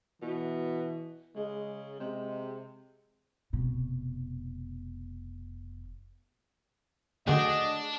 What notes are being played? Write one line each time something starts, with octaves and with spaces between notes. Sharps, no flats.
B2 E3
C#3 G#3
C3 G#3
F1 B2
D#2 D3 A3 D4 F#4 G#4 D#5